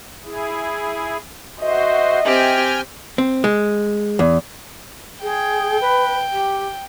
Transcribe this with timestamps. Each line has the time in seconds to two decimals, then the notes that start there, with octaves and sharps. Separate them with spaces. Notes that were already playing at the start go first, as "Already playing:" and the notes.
0.24 E4 G#4
1.60 F#4 C5 D#5 E5
2.25 C4 G4 G5 G#5 F6
3.18 C4
3.44 G#3
4.19 E2
5.22 G#4 G5
5.80 B4
6.32 G4